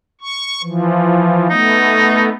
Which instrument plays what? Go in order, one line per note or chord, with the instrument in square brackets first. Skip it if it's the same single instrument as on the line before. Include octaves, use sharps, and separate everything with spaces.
[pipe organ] C#6
E3 F3
[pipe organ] A3 B3 [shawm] D#4